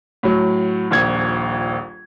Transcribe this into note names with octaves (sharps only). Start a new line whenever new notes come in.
A2 F#3
D#1 A#1 G#6